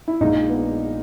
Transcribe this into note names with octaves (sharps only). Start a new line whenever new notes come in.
E4
A#1 A#2 G#3 D#4
B3